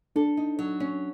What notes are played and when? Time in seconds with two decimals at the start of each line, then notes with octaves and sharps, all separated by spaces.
0.16 D4 A4
0.37 D#4
0.59 F#3
0.80 C#4